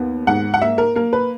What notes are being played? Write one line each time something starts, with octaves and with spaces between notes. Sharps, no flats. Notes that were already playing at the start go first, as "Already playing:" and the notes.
Already playing: D#2 B3
G#2 F#5
F#5
A#3 E5
A#4
A#3 A#4
B4